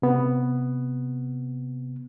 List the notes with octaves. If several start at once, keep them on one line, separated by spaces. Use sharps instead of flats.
C3 B3